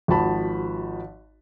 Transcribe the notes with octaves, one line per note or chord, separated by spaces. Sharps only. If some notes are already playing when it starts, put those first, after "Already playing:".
G#1 F3 F#4 A5 B5